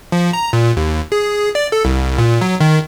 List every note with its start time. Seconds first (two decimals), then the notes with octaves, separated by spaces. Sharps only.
0.12 F3
0.33 A#5
0.53 A#2
0.77 D#2
1.12 G#4
1.55 D5
1.72 A4
1.85 C2
2.18 A#2
2.41 F#3
2.61 D#3